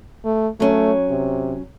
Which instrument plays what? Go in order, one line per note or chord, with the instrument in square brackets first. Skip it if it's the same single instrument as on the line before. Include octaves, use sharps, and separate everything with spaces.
[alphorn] A3
[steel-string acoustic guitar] F#3 C#4 [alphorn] A3
[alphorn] C3